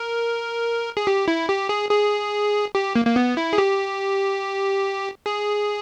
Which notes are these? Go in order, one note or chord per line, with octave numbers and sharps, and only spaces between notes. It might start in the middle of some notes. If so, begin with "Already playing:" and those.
Already playing: A#4
G#4
G4
E4
G4
G#4
G#4
G4
A#3
A#3
B3
E4
G#4
G4
G#4